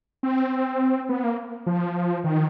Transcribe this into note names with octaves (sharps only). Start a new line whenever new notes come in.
C4
B3
A#3
F3
D#3